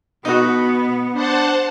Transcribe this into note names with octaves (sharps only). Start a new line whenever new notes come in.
B2 B3 D#4 F#4
D4 C5 F#5 A5